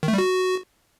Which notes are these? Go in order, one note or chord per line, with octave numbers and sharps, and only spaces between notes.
D#3
A3
G3
F#4